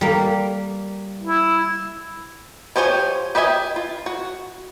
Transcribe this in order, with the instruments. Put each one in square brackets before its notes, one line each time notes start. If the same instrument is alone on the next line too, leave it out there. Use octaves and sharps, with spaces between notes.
[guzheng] G3 A#3
[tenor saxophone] E4
[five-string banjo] F3 G4 C5 C#5 G#5
G4 B4 D#5 E5 G#5
F4
F#4